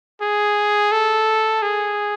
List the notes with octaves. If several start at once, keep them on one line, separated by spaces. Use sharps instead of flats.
G#4
A4
G#4